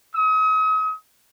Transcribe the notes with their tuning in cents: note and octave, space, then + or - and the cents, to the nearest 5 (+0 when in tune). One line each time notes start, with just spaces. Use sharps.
D#6 +40